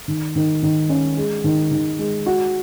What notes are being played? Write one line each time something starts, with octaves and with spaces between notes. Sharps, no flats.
D#3
D#3
D#3
C#4
G#3
D#3
D#3
G#3
F#4